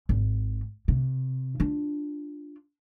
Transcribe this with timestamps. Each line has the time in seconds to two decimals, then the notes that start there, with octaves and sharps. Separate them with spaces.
0.09 G#1
0.88 C3
1.60 D4 F4